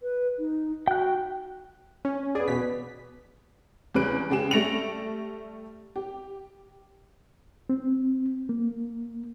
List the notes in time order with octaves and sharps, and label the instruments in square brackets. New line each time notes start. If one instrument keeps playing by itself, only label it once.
[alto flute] B4
D#4
[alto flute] F#4 [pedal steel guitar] G5 F#6
[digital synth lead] C#4
[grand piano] B3 D5 [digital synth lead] G#4
[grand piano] E1 B2 B3 [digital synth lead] B6
[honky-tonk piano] E2 C#3 G3 B4 F#6 D7
C#3 G#3 G4 G#4 E7
G3 A3 A#6 C#7 D7 F7
G4
[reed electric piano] C4
A#3